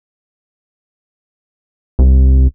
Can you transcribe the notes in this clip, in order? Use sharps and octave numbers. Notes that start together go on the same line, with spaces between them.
C2